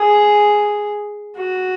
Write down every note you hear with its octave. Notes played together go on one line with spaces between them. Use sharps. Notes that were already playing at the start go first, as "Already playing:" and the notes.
Already playing: G#4
F#4